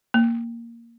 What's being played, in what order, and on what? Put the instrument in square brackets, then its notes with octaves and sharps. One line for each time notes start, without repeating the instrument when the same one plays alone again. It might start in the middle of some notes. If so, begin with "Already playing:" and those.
[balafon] A#3